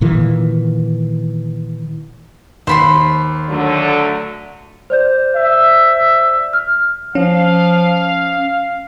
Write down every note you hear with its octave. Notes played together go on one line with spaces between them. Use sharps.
A#2 D#3 E3
D#2 C5 B5 C6
D3 F#3 A3
C5 D5 G6
E5
F6
F3 C#4 F5